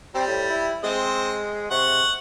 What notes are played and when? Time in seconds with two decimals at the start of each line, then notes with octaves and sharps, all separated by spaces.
0.15 G3 C4
0.27 A2
0.50 E4
0.83 G#3 C4 D#5
1.71 C3 F#5 C#6